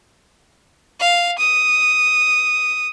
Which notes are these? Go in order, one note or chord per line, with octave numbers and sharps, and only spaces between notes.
F5
D#6